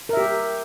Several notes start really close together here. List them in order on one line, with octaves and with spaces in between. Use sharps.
A#4 E5 G4